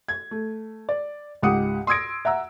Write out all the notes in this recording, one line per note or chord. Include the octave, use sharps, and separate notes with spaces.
G#6
A3
D5
C#2 G#2 G4 F#5 D#6 C#7
C6 D#6 E6 G#6 A#6 D7
E5 F#5 A#5 E6